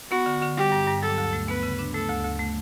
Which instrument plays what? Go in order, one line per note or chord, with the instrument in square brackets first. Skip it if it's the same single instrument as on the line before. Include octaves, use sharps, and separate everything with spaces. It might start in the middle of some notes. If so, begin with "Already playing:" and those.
[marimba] B3 [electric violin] F#4
[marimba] D3
D3
[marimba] G3 [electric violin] G4
[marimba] G2
G2
[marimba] F#3 [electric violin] A4
[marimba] D2
A3
[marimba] B3 [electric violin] B4
[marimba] C#3
D4
[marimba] A3 [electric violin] A4
[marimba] D2
D2
A3